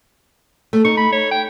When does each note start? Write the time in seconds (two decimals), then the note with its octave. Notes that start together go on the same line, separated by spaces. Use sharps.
0.73 A3
0.85 D#4 C#6
0.97 B5
1.12 C#5
1.31 G5